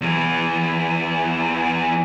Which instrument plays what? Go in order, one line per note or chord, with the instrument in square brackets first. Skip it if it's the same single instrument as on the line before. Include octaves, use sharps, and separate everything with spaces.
[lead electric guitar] E2 E3